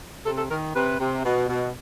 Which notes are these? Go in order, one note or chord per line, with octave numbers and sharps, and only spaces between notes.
C3 A4
A4
D#3 A#4
C3 B4
C3
B2
B2